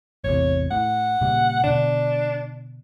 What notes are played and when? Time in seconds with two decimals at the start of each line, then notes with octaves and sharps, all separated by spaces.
0.24 A1 E2 C3 C#5
0.71 A2 F#5
1.21 A#2 C#3 G3
1.64 B2 D3 D4